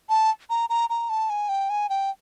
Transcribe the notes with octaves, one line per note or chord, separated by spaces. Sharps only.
A5
A#5
A#5
A#5
A5
G#5
G5
G#5
G5